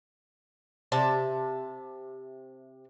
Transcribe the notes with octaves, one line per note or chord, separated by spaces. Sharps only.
C3 E5 A5